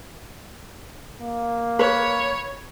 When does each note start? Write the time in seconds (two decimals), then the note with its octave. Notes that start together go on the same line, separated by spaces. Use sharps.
1.21 A#3
1.79 B4 C#5